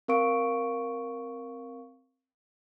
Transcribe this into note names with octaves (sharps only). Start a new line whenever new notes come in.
C4 A#4 F5 C#6 D7